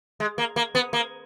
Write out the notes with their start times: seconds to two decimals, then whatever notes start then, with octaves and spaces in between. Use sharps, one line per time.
0.20 G#3
0.38 A#3
0.56 A#3
0.75 B3
0.93 A#3